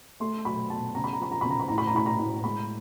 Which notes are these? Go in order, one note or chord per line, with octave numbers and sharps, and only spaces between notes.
A3 C6
F#3 B5
B2 A5
C#3 A#5
B5
A#5
F3 B5
A#5
C#3 B5
A#5
B5
A2 A#5
B5
A#5
A2 B5
A#5
A2
G#3 B5